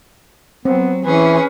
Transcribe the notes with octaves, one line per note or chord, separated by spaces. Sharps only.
F#3 B3 C4
E3 C#4 G#4 B4